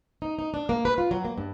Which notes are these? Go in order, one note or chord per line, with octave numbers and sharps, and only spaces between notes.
D#4
D#4
D4
A#3
B4
F4
F#3
A#3
G2